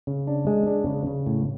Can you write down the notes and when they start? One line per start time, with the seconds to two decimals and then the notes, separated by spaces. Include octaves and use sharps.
0.07 C#3
0.27 D4
0.47 G#3
0.67 D4
0.86 C#3
1.07 C#3
1.26 A2